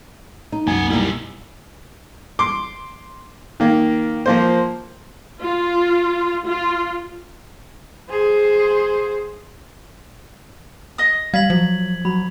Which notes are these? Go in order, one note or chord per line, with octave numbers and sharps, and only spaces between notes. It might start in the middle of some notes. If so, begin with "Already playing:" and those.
D#4
C2 F#2 A#3 F#5 G#5
B2 G3 A#3 D#4 E4
C6 D6
D#3 A#3
F3 A#3 C5
F4
F4
G#4 C5
D#5 D#6
G3 F5 G#6 B6 F#7
F3 F#3
F#3 B5